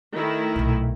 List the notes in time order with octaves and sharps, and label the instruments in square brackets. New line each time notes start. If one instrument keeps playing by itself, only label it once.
[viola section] D#3 A3 E4
[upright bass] B1 A#2